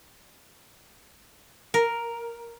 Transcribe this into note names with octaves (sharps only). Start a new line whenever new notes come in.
A#4